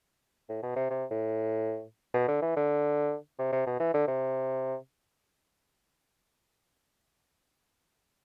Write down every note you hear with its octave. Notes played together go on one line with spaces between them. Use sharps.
A2
B2
C3
C3
A2
B2
D3
E3
D3
C3
C3
B2
E3
D3
C3